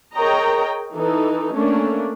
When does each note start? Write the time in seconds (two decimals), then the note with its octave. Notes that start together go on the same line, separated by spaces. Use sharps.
0.16 G#4 A#4 C#5 D#5 G5 A#5
0.93 E3 D#4 A4
1.54 A3 A#3 C#4 D4